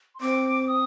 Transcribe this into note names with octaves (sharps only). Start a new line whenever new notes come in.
C6
C4 D6
D#6